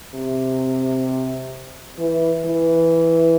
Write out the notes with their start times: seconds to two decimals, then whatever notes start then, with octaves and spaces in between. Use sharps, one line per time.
0.14 C3
1.99 E3
2.46 E3